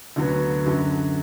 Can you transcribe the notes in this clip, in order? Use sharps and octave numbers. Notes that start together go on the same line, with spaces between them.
D2 D3 F#3 B3
F#2 D3 F#3